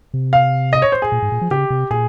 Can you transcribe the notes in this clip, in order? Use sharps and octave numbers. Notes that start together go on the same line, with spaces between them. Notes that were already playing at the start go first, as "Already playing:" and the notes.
C3
F5
D#5
C#5
C5
G#4
A#2
G#2
A#2
F3
C#3 G4
C3
A#2 G#4